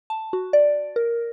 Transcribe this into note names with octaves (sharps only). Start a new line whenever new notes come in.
A5
F#4
D5
A#4